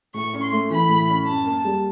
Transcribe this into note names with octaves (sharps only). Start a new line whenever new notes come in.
A2 C#6
C#4
C6
A3
E3 B5
A2
C#4
F#2 A5
A#3
G3